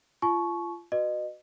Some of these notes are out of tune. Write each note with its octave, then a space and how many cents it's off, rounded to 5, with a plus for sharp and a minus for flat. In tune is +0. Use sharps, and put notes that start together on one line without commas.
F4 -25 A5 -45 C#6 +0
F#4 +0 B4 +0 D#5 -30